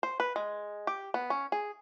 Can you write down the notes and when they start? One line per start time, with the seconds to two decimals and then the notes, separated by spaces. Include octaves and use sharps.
0.03 C5
0.20 B4
0.36 G#3
0.87 G4
1.14 B3
1.30 C#4
1.52 G#4